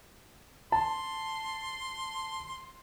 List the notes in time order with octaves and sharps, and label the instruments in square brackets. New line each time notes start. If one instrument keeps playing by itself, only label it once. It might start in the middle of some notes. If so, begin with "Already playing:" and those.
[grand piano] A5 [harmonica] C6